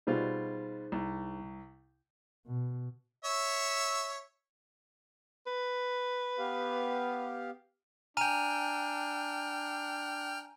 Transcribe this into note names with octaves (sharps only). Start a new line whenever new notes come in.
B2 G3 D#4 F4 G#4 C5
C2
B2
C#5 E5
B4
B3 G4 F5
D4 G5 G#5 A#5 F6 D#7